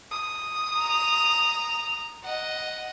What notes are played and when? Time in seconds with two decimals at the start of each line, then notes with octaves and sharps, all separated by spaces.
0.11 D#6
0.78 A#5 F7
2.25 D#5 F#5